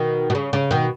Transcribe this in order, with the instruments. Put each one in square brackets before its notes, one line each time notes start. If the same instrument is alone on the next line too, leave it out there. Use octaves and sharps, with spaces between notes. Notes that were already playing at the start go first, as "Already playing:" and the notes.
Already playing: [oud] B2 D#3
B2
C#3
C#3
B2 D#3